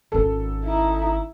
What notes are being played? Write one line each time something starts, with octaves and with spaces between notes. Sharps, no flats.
G#1 C#4 A4
D#4 E4